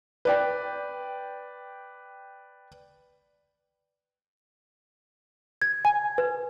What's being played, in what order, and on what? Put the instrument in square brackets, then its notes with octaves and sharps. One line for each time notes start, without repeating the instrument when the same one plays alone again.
[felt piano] B4 D5 G5
[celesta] G#6
G#5
B4